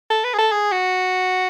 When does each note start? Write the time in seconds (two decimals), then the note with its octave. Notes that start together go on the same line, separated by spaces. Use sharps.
0.11 A4
0.24 B4
0.34 G#4
0.39 A4
0.52 G#4
0.72 F#4